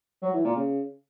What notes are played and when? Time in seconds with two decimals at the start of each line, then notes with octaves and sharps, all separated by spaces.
0.22 F#3
0.33 E3
0.45 A#2
0.56 C#3